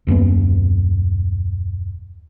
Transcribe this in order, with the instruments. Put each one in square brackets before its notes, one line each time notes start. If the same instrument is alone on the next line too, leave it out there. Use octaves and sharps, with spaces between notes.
[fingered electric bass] D#1 F#2 A#3 B3